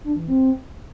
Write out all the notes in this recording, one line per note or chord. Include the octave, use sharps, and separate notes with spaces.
D4
E3
C4